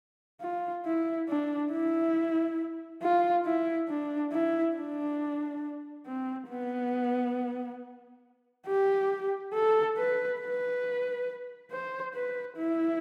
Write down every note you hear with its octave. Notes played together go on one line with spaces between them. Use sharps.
F4
E4
D4
E4
F4
E4
D4
E4
D4
C4
B3
G4
A4
B4
B4
C5
B4
E4